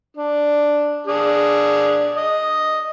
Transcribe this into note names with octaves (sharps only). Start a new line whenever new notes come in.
D4
D4 G#4
D#5